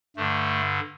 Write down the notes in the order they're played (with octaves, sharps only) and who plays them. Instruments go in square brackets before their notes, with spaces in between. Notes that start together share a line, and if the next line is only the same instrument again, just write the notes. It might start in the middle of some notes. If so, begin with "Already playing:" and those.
[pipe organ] G2 D3 A3